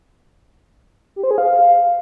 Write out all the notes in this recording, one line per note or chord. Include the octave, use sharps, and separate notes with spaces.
G4
C5
G#4
F5